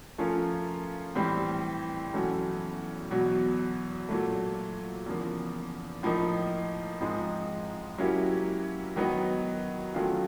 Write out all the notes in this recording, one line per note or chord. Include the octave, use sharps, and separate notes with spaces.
F3 A3 C#4 F4 A#4
A2 E3 G3 C4
E2 B2 F#3 A3 C#4
E2 B2 F#3
A#2 F#3 A3
E2 C#3 F3 A#3
A2 F3 A#3 D#4
G#2 F3 G#3 C4 D#4
F#3 A#3 C#4 E4 G4
D#3 F#3 B3 D#4
D#3 F#3 A3 C#4 F4